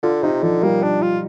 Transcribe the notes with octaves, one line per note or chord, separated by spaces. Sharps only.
D3 F4
C3 D#4
D3 F3
G3 A#3
D4
F4